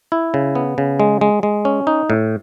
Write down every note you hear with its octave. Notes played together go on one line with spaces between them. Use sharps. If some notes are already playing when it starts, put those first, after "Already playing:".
E4
C#3
B3
C#3
G#3
G#3
G#3
C#4
D#4
A2